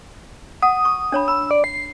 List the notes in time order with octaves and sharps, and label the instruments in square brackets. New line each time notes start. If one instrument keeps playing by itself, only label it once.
[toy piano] F#5 [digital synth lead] D#6
[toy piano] C#6
D4 C#5 B5
[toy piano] B5 [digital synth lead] E6
[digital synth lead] D5
C7